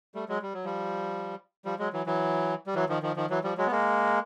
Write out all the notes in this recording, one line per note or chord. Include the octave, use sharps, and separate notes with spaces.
G3 A3
F#3 G#3
G3
F#3
F3 G3
F3 G3
F#3 G#3
E3 F#3
E3 F#3
G3
E3 F#3
D#3 F3
D#3 F3
D#3 F3
E3 F#3
F3 G3
F#3 G#3
B3
G#3 A#3